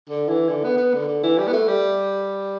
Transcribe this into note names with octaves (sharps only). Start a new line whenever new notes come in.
D3
E3
D3
B3
B3
D3
D3
E3
G3
B3
A3
G3